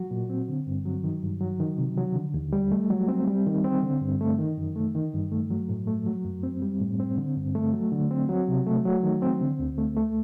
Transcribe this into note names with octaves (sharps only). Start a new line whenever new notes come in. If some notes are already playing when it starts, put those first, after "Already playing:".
Already playing: F#3 F#4
A#2
C4
D3
G2
F#3
D#3
G2
F#3
D#3
C3
F#3
D3
D#2
G3
A3
F#3
C4
G3
D#3
C4
D3
G2
A3
D#3
F#2
A3
D#3
G2
A3
F#3
A2
A3
F#3
F#2
C4
G3
A2
C4
D3
G2
A3
F#3
D3
C4
F#3
C3
A3
F#3
D#3
C4
D3
D2
A3
A3